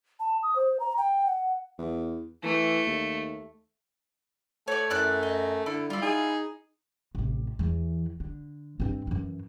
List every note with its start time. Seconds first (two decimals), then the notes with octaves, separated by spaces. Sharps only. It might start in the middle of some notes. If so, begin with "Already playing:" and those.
0.20 A5
0.43 D#6
0.56 C5
0.80 A#5
0.98 G5
1.26 F#5
1.78 E2
2.43 E3 A3
2.87 D#2
4.68 A3 C#5 D5
4.90 F#2 E4 D5 F#6
5.23 D#5
5.66 D3 E4
5.90 G3 E4 F4
6.02 D#4 G#4
7.15 A1 C3
7.59 E2 E3
8.20 D3
8.80 G2 C4
9.07 F#2 E3